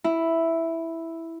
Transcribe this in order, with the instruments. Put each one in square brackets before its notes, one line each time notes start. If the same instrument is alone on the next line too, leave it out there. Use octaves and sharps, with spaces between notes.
[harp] E4